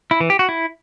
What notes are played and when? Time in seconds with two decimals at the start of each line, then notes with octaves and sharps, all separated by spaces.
0.11 E4
0.20 E3
0.30 G4
0.39 F#4
0.49 E4